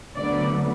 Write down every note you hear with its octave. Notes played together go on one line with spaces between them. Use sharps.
D2 D3 F#3 B3 D5